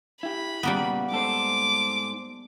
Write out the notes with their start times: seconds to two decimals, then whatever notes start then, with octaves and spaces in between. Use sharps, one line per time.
0.23 E4 G4 B5
0.63 A#2 C#3 G3 A#3 B3
1.12 G#2 A4 C5 D6